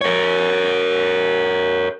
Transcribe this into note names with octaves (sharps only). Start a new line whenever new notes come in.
A#4 C#5